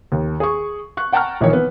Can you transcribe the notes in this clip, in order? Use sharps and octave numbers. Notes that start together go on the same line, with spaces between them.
D#2
G#4 C#6
C#6 F#6
F#5 G5 A5 A#5 C#6 F6
A#1 D#3 E3 C#5
B3